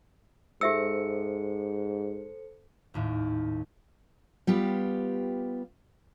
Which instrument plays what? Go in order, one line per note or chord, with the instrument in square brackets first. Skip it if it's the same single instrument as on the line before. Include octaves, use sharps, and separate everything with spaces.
[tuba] G#2 [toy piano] G4 E5 E6 [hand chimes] A4 C5 C#7
[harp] G#1 D#2 A2
[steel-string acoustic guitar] G3 B3 F4 G4